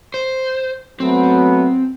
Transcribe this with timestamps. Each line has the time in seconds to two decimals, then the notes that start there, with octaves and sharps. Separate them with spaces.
0.14 C5
1.00 F#3 A3 B3 C4